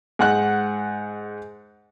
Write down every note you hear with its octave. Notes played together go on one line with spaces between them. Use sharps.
G#2 F#5 F#6